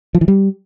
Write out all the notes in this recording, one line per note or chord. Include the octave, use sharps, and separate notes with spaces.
F3
E3
G3